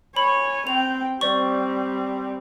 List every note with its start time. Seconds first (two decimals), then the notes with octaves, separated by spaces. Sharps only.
0.16 C#5 G#5 B5
0.67 C4 G5 F7
1.21 G3 C4 C5 D5 C#6